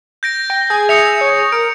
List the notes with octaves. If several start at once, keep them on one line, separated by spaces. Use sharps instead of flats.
G6 A#6 D7
G5
G#4 G#6
E5 D#6 C#7 F7
C#5
A#4 D7